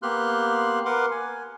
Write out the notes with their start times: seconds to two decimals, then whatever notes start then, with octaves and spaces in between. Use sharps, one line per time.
0.02 A#3 B3 G4 C6 F6 F#6
0.85 A#4 B4 F#5 C6 D6
1.11 G#5